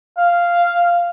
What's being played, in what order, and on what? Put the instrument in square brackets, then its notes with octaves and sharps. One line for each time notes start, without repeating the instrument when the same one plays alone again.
[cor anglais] F5